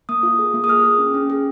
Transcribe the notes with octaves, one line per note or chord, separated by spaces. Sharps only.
A#3 D#6
F4
G#4
A#3
D#6
G#4 F6
G#4
C#4
C#4
G#4